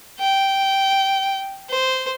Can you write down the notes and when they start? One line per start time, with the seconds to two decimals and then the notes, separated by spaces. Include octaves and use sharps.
0.19 G5
1.70 C5